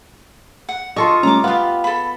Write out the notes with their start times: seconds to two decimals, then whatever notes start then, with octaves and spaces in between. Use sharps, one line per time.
0.69 F#5
0.96 F4 A4 D#5 C#6
1.23 G3 A3 C#4 A#5 D6
1.44 B3 F4 G4 F5
1.84 A4 B5